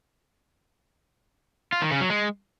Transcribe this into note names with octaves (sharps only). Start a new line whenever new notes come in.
F4
D#3
C#3
F#3
G#3